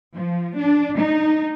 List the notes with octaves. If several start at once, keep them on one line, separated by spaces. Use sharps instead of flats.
F3
D4
D#4